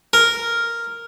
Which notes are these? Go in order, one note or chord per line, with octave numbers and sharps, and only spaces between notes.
A#4